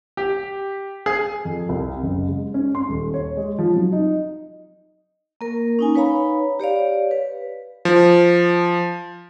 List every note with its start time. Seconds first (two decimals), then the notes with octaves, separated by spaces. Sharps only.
0.17 G4
1.06 G#4
1.45 F2
1.69 C2
2.03 F#1
2.28 G#3
2.54 C#4
2.75 C6
2.89 D#1
3.14 C#5
3.37 G#3
3.59 F3
3.76 F#3
3.92 D#4
5.41 A#3 A#4
5.79 C#4 D#4 G#5
5.95 D#4 B4 C#5 F5 A#5 B5
6.60 G4 C#5 D5 F5
7.11 B4
7.85 F3